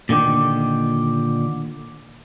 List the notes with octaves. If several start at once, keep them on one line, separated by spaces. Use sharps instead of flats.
A#2 D3 D#3 G4